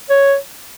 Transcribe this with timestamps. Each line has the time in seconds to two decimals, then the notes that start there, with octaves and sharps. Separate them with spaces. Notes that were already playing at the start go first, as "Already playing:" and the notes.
0.10 C#5